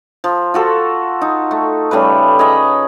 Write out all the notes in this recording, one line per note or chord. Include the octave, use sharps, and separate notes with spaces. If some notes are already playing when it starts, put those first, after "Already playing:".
F3
F4 F#4 A4
D#4
A3
C#3 G3 A3 B4
G#4 C#5 D#5 B5